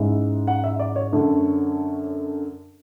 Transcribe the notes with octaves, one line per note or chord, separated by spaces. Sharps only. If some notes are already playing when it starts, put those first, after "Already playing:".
Already playing: G#2 G#3 C#4 E4 E5
F#5
E5
D5
C#5
F#2 D3 A3